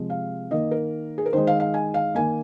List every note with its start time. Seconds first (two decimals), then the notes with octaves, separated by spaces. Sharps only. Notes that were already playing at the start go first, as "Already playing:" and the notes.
Already playing: C3 F3 G#3
0.10 F5
0.51 D#3 A#3 D#5
0.71 A#4
1.18 G#4
1.26 A#4
1.33 D#3 G#3 C5
1.47 F5
1.60 F5
1.74 G#5
1.94 F5
2.15 D#3 A#3 G#5